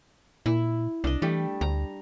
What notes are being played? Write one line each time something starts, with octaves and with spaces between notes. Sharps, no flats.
A#2 E4
C2 D4 D#5
E3 G3 A3
D2 A#5